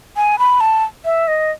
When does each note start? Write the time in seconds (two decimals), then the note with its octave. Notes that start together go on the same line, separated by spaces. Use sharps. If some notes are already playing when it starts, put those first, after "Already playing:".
0.16 G#5
0.39 B5
0.61 A5
1.05 E5
1.28 D#5